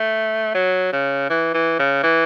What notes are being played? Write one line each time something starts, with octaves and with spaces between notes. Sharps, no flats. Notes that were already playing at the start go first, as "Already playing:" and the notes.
Already playing: A3
F#3
C#3
E3
E3
C#3
E3